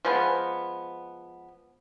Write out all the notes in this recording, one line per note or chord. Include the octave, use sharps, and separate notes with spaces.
F3 G#3 B3